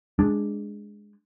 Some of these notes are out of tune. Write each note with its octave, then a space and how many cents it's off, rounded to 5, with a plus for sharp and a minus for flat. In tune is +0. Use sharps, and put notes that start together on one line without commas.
G#3 +0 D4 +0